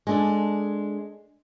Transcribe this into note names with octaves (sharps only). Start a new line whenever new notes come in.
G#3 D4 A4